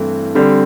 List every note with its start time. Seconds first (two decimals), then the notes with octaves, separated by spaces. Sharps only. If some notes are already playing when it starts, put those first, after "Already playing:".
Already playing: G2 E3 A3 C4
0.35 D3 G3 C4